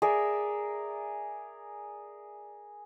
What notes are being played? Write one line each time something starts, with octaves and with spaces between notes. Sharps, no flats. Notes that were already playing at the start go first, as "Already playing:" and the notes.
G#4 A#4 D5 E5